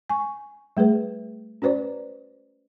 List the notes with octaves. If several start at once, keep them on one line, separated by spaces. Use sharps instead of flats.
G#5 C#6
G3 A3 G#4 B4
C#4 F#4 B4 C5 D5